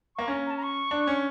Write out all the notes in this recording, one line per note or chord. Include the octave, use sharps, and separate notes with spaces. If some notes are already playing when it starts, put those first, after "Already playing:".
A#3 C#6
C#4 A#5
A#5
A5
A#5
C#6
D4
C#4